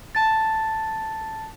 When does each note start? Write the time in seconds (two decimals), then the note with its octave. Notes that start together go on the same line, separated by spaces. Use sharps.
0.15 A5 A6